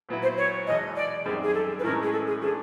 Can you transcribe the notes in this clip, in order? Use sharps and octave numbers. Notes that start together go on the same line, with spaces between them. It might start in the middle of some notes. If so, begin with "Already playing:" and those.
A#2 F#3 B3 E4
C5
C#5
E2 B2 G#3 D#5
D5
F#2 D#3 G3 C4 G#4
G#4
A4
B4
A2 E3 G#3 C#4 A#4
G#4
A4
G#4
E3 A3 D4 G#4